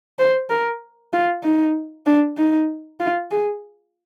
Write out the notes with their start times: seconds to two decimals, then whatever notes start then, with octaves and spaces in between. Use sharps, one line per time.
0.19 C5
0.50 A#4
1.13 F4
1.44 D#4
2.06 D4
2.37 D#4
3.00 F4
3.31 G#4